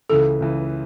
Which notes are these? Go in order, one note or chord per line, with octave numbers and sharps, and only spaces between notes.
C#2 C#3 E3 A4
C#2 C#3 E3